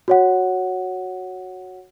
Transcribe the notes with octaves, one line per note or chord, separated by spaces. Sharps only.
F#4 C#5 F#5